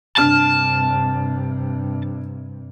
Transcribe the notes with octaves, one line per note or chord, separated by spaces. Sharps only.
G2 C3 D4 A5 F6